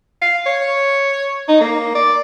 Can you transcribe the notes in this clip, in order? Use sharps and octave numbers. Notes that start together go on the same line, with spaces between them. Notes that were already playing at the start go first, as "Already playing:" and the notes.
F5
C#5
D#4
A#3
D5